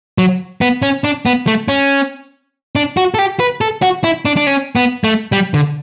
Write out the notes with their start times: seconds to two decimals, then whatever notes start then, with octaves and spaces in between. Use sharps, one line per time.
0.18 F#3
0.61 B3
0.82 C#4
1.04 D4
1.26 B3
1.47 A3
1.68 C#4
2.75 D4
2.97 F#4
3.14 A4
3.19 G4
3.40 B4
3.61 A4
3.82 F#4
4.04 E4
4.25 D4
4.37 D4
4.47 C#4
4.76 B3
5.04 A3
5.32 G3
5.54 D3